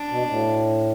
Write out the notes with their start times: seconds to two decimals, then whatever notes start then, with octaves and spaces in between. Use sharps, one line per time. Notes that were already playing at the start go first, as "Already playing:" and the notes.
Already playing: D4
0.11 B2
0.29 A2